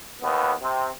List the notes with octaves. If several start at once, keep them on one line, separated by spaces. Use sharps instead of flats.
D#2 B3
C3 C4